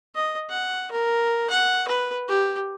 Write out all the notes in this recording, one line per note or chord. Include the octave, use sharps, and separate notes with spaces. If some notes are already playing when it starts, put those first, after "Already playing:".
D#5
F#5
A#4
F#5
B4
G4